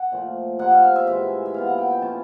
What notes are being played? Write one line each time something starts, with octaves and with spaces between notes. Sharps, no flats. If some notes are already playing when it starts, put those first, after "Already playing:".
Already playing: F#5
A#2 F3 A3
C3 F3 A#3 D#4 F#5
F5
F5
E5
A2 E3 G#3 E5
E5
A#2 G3 B3 F5
F#5
G5
G5
F3 A3 C#4 E4 A5